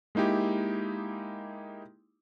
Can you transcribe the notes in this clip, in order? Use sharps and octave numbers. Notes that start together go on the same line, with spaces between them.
G#3 A#3 D#4 E4 G4